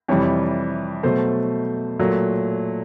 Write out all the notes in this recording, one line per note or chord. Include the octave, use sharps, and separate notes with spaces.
F2 C3 E3 G3 C#5
B2 F#3 A3 C5
A#2 F#3 A3